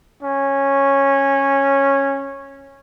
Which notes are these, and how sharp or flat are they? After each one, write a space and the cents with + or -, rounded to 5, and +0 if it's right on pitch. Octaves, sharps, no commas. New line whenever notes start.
C#4 -10